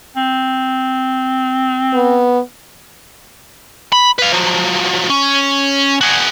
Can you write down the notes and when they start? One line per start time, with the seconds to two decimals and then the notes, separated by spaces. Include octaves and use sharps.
0.16 C4
1.93 B3
3.93 B5
4.19 B4 F5
4.32 F3 F#3
5.10 C#4
6.01 F#4 G#4